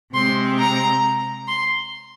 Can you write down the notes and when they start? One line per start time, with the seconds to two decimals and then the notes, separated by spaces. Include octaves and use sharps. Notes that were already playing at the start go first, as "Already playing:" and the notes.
0.13 C3 G#3 C4 C6
0.58 A#5
1.47 C6